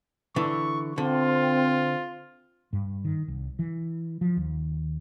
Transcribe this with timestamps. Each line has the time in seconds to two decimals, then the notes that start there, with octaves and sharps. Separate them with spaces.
0.36 D3 E3 C#6
0.98 D3 C4 F4
2.73 G2
3.04 D#3
3.28 C2
3.59 E3
4.21 F3
4.37 D#2